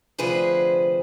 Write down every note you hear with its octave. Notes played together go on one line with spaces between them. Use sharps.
D2 C3 F3 G#4 B4 C5